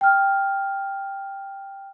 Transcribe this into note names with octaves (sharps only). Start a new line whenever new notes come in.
G5 F6